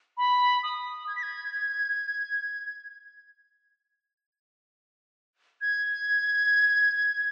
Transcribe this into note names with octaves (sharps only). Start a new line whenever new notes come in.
B5
D#6
G#6
B6
G#6
G#6